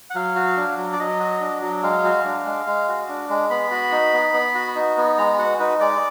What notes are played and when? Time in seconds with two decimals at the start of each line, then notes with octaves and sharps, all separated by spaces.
0.10 F#5
0.15 F#3 F5
0.36 F#4
0.57 D4
0.78 F#3
0.93 D5
0.99 F#3 D#5
1.20 F#4
1.40 D4
1.61 F#3
1.83 G#3 F5
2.04 F#4
2.24 D4
2.46 G#3
2.66 G#3
2.88 F#4
3.08 D4
3.30 G#3
3.50 B3 B5
3.71 F#4
3.92 D#4
4.13 B3
4.34 B3
4.55 F#4
4.76 D#4
4.97 B3
5.18 G#3 A#5
5.39 F#4 F#5
5.60 D#4 B4
5.80 G#3 D5